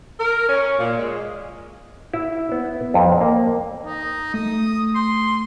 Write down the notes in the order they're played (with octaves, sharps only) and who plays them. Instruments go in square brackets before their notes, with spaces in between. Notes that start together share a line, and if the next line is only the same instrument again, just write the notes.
[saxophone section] A#4
C#4
A#2
G#3
[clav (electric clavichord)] E4
B3
F2
A#3
[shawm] D#4
[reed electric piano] A3 [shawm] D#6
[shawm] C6